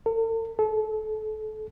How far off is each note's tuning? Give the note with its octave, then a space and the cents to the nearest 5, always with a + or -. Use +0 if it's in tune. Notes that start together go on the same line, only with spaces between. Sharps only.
A4 +45
A4 -30